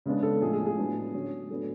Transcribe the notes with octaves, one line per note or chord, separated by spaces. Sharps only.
C#3 G#3 B3 D4
A4
A2 F3 G#3 G#4
G#4
G#4
A2 F#3 B3 D4
D3 F#3 C#4
A2 F#3 B3 D4 A4